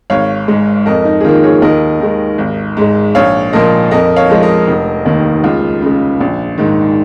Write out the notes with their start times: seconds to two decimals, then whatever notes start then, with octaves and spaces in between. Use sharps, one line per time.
0.10 G#1 C#5 F5
0.48 G#2 G#3
0.86 F2 A#4 D#5
1.05 D#4
1.20 G#4
1.25 D#3 A#3 F4
1.44 G#4 C#5
1.62 D#2 A#4 D#5
2.00 D#3 G#3
2.38 G#1
2.77 G#2 G#3
3.15 A#1 C#5 F5
3.53 A#2 F3 A#3 A#4 D#5
3.91 F2 A#4 D#5
4.16 C#5 F5
4.30 F3 G#3
4.42 A#4 D#5
4.68 F1
5.06 D#2 D#3 A#3
5.44 C#2 F4
5.82 C#3 G#3
6.20 A#1
6.58 G#2 D#3